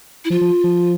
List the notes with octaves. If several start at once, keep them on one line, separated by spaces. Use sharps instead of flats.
E4
F3 F4
F3
F3